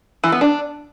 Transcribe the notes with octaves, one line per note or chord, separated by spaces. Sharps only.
E3
B3
D4